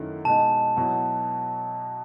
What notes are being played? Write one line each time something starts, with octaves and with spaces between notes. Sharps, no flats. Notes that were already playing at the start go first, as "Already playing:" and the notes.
Already playing: F#2 D#3 A3 E4
B2 G#3 D#4 A5
B2 F#3 B3 E4